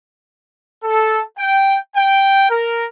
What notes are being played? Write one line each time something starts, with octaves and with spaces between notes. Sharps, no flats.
A4
G5
G5
A#4